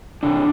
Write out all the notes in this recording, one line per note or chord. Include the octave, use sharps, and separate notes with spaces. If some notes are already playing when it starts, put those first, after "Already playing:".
C3 D4